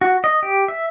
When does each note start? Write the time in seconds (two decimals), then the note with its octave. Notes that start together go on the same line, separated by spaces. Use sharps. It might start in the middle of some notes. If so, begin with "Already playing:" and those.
0.01 F#4
0.24 D#5
0.43 G4
0.68 E5